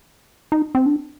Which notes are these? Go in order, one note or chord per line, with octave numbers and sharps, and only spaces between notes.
D#4
C4
D4